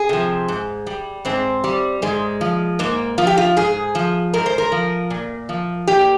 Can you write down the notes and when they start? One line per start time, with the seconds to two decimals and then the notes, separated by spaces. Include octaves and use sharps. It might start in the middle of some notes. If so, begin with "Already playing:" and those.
Already playing: G#4
0.09 C3 F3
0.48 G#2
0.87 G3
1.25 G#2 C4
1.64 G3
2.02 G#2 G#3
2.41 F3
2.79 G#2 A#3
3.18 F3 F4
3.27 G4
3.38 F4
3.57 G#2 G#4
3.95 F3
4.33 G#2 A#4
4.46 C5
4.58 A#4
4.72 F3
5.10 A#2
5.49 F3
5.87 A#2 G4